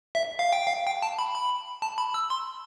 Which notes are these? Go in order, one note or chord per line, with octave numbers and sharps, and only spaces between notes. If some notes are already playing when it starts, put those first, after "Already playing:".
E5
F5
G5
F5
G5
A5
B5
B5
A5
B5
E6
C6